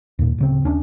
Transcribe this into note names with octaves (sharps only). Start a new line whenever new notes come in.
D#2 A#2
D1 C#3 C4
D#2 C#4 D4